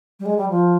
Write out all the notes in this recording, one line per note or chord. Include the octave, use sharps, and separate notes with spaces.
G3
G#3
G3
F3